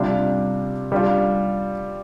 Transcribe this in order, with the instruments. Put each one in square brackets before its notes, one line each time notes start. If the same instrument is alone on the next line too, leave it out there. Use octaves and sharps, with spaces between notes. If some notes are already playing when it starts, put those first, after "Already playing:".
Already playing: [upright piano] C3 G3 D4 F4
G3 D4 F4